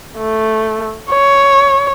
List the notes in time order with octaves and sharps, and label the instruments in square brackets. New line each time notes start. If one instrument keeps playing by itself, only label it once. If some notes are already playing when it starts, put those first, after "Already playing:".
[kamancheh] A3
C#5